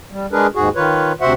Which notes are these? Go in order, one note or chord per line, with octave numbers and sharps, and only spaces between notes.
G3
G#3 D4 G#4 A#4 B4
D#2 G#2 F#4 G#4
D#3 F4 B4 C#5
D2 C3 F#4 C5 E5 F#5